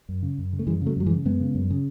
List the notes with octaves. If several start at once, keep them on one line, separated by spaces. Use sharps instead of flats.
F#2
C#3
F#2
C#3
A3
F#2 E3 G#3
C#3 F#3 A3
F#2 F#3
E3 G#3
C#3
F#2 G#3 B3
C#3
F#2
C#3